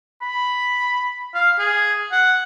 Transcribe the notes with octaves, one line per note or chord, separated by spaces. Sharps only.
B5
F5
G#4
F#5